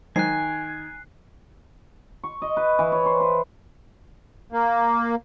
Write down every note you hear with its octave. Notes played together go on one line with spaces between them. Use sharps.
D#3 F#3 G#3 C5 G#5 F#6 C7
C#6
D#5
B4
E3
C#5
C5
B4
A#3